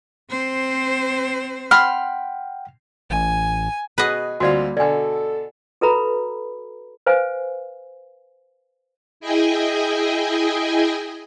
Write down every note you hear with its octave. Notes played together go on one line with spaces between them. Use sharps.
C4 C5
F#5 G5 B5 C6 F6
A1 G#5
B2 F#4 G#4 B4 D#5
D2 G3 A#3 C4 F4 F#4 D5
B2 D3 A4 D5 G#5
F#4 A4 B4 E5 A#5 B5
B4 C5 F5 G#5
E4 G#4 D#5 G5 G#5